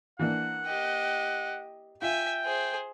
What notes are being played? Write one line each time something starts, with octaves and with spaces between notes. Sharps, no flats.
E3 A#3 D4 F#5
G4 D#5
F4 E5 G5 G#5
G#4 C5